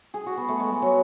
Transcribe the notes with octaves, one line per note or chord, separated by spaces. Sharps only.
G#4
F#4
B3
A3
G#3
G#3
F#3